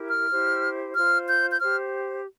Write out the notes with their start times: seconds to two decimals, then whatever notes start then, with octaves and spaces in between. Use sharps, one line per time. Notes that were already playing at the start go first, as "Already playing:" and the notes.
Already playing: E4 G4 A#4
0.09 F6
0.30 E4 G4 C5
0.95 F4 C5 F6
1.28 G6
1.51 G6
1.61 G4 C5 F6